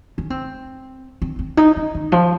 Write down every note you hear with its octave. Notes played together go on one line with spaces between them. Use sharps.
C#4
C4
C4
C4
D#4
C#4
D#3
F3